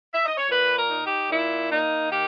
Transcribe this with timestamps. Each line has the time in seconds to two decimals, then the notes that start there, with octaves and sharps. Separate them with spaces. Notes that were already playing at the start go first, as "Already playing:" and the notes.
0.13 E5
0.25 D#5
0.37 C#5
0.49 A#2 B4
0.76 A#4
0.90 D#4
1.03 G4
1.30 A#2 E4
1.70 A#3 D#4
2.10 D#3 G4